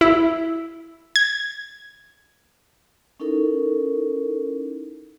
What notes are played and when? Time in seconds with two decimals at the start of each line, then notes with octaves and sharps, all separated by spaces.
0.01 E4
1.16 G#6
3.20 C#4 D#4 E4 A4 A#4